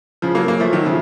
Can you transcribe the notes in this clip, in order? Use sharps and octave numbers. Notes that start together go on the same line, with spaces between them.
C#3 F3
F#3 A#3
F#3 A#3
F3 A3
D#3 F#3
C#3 F3